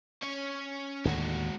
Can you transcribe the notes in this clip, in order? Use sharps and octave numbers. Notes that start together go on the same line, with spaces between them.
C#4 C#5
D#2 A2 D3 G#3 F#4